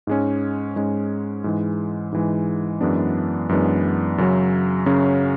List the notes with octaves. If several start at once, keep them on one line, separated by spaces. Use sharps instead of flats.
G#2 G#3 C#4
G#2 G#3 C#4
G#2 E3 G#3
G#2 E3 G#3
F#2 E3 G#3 B3 D4
F#2 E3 G#3 B3 D4
F#2 C#3 F#3 C#4
F#2 C#3 F#3 C#4